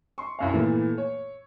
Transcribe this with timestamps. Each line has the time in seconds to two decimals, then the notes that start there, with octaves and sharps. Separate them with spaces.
0.18 C6 C#6
0.39 C2 F#2 F5
0.54 A#2 E3 A3 B3
0.98 C#5